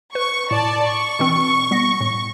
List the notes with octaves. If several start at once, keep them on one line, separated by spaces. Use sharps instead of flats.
B4 C#6
A2 D5 A5
C#6
B2 E3 C4
G3 B3 A#6
A2